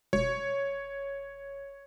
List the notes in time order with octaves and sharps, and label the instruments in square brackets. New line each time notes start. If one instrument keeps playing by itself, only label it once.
[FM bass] E1 [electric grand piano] C#5